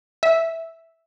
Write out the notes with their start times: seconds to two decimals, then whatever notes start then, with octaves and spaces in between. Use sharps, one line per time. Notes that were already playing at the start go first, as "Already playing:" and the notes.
0.23 E5